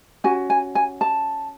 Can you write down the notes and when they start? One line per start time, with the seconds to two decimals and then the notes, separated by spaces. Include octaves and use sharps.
0.24 C#4 F#4 G#5
0.50 G#5
0.75 G#5
1.01 A5